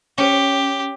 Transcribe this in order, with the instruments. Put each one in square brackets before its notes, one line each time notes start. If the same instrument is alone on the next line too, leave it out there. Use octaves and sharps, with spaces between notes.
[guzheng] C#4 [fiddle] G4